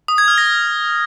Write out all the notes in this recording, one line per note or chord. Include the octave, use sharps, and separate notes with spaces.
D#6
G#6
F6
A#6